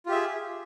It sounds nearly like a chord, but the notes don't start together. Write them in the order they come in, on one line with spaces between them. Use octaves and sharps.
F4 G4 E5 G#4